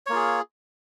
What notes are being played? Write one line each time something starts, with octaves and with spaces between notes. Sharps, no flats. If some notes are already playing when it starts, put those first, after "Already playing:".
A#3 F4 G#4 C#5